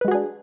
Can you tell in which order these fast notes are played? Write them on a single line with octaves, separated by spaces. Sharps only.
B4 G#3 F#4 G#4 D4